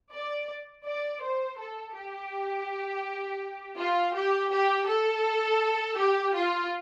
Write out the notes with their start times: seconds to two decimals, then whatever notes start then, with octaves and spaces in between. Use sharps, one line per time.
0.13 D5
0.86 D5
1.23 C5
1.58 A4
1.96 G4
3.78 F4
4.14 G4
4.51 G4
4.87 A4
5.97 G4
6.34 F4